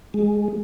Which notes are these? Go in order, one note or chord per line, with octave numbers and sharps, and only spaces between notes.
G#3